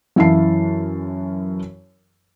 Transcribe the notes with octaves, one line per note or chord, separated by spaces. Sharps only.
F#2 E3 E4 F5 A5 C7